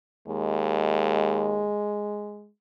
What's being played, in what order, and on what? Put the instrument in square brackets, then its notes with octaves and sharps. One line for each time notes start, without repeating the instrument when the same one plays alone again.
[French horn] D#2 [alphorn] G#3